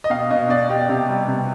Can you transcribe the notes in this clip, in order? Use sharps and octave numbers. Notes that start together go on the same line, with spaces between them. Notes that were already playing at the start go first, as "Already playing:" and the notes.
D#5
B2 F5
B2 D#5
B2 D5
B2 G4
C3 G4
G3
C3